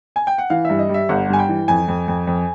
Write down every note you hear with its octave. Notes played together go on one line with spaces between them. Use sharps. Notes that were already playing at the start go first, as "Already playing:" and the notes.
G#5
G5
F#5
E3 F5
G2 E5
D#5
G3 E5
G1 F#5
G2 G#5
G5
E3
F2 G#5
F2
F2
F2